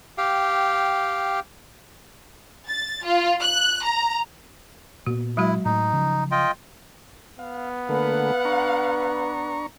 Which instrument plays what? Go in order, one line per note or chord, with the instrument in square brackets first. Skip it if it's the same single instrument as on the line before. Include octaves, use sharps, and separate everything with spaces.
[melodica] G4 F5 G5
[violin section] A6
F4
F#6
A#5
[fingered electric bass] A#2 B3 [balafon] F#4
[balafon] F#3 G#3 F#4 [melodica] E4
[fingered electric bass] A2 [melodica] D#4
[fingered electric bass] C#3 F3
[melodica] F4 D#5 G5
[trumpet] B3 [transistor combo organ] F5
[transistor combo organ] D3 A3 A#3 [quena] B4 [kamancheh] F5 F#5
[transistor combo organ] D4 A#5 C#6